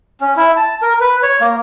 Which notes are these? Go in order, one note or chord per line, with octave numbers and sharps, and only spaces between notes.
C#4
E4
A5
A#4
B4
C#5
A#3